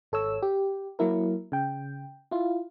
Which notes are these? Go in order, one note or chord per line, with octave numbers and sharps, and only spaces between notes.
G#1 A4 C#5 E6
G4
F#3 A#3 E4 A#4
C#3 G5
E4 F4